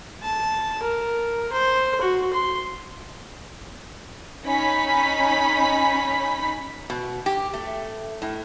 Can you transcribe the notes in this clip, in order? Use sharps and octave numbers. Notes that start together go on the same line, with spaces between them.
A5
A#4
C5
F#4
C6
C#4 D#4 B5 B6
B2
G4
A3
A2